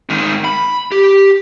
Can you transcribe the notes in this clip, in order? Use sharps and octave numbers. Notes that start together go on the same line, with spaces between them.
G#2 D#3
B5
G4